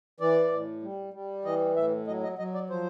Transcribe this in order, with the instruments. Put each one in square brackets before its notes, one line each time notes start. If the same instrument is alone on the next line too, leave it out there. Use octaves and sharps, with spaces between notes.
[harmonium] E3 D5
A2
G3
G3
E3 D#5
A2 E5
F#3 D#5
D#5
F#3 D#5
D5
F3 C5